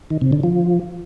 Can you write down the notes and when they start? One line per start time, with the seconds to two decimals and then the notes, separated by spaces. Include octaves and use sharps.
0.10 D#3
0.21 C3
0.32 D3
0.43 F3